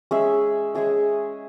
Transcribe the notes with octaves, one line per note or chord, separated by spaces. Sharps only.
G#3 C#4 G#4 E5
G#3 C#4 G#4 E5